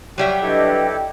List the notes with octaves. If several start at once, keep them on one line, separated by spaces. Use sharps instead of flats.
F#3 G3 G4 E5 G5
D4 E4 G4 A4 B4 D#5